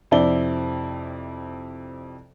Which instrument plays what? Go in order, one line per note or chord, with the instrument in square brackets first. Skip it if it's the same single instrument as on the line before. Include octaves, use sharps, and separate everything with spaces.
[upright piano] F2 C3 C4 E4 D5 G7